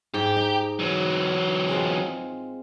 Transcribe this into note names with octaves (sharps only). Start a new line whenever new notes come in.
G#2 G4
D#4
E3 F#3
G#3 C4 F4